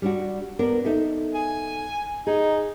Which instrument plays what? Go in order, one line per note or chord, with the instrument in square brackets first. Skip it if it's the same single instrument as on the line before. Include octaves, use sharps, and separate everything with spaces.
[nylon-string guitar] G3 D4 F#4
B3 D4 A#4
D#4 A4 E5
[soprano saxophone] G#5
[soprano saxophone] D#4 [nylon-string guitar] G#4